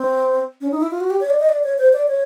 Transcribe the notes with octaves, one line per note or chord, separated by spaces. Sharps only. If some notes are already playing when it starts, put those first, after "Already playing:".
Already playing: C4
C#4
D#4
E4
F4
F#4
G4
C#5
D5
D#5
D5
C#5
C5
D5
C#5